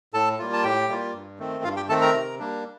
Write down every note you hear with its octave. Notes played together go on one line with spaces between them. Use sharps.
A2 A4 A5
G3 A#3 F4
A5
A2 G4 G5
G3 A#3 F4
G2
D#3 A3 C4
G2 F4 F5
G4 G5
D#3 A3 C4 A4 A5
A#4 A#5
C3
G3 A#3 D4